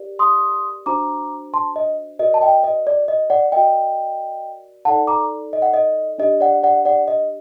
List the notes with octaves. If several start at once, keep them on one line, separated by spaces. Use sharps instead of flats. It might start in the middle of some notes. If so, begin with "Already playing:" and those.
Already playing: G4 A#4 D5
C6 D#6
D4 F#4 C5 A#5 D6
A5 C6
D#5
F#4 A#4 D5 D#5
A5
D#5 G5
D#5
D5
D#5
D5 F#5
F#4 A#4 D5 D#5 G5
D#4 A4 D5 F#5 A5
A#5 D6
D#5
F#5
D#5
D4 G4 D5 D#5
D5 F#5
D5 F#5
D5 F#5
D#5